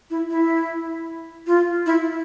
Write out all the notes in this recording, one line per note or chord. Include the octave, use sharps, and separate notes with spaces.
E4
E4
F4
E4